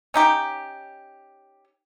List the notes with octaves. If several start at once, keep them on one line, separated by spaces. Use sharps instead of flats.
C#4 D#4 G4